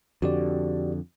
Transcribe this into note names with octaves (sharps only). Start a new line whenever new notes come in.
F2 D3 F#4 G4 D5